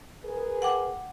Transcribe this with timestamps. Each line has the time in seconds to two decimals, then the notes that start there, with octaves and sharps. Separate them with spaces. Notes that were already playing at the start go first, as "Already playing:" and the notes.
0.24 G#4 A#4 B4
0.62 F#5 G5 D6